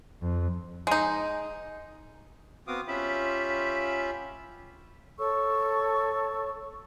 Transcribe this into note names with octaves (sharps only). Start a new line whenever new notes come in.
F2
G#3 D#4
B3 C4 F#4 F5 D6 D#6
C#4 F4 G4 E5 B5
A4 C#5 C#6 E6